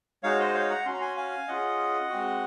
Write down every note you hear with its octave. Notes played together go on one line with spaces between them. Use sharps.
G#3 D#4 F#4 C#5 F5
C5 D#5
C#5 F5
F#5 A#5
C#4 F#4 A#5 C6
G#5 C6
F5 G#5
C#4 F4 G#4 D#5 F#5
G#3 C4 F#4